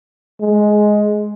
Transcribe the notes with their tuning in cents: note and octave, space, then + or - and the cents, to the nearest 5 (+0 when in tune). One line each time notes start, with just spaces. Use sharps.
G#3 +10